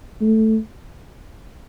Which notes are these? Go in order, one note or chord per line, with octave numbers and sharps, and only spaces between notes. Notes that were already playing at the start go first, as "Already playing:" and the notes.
A3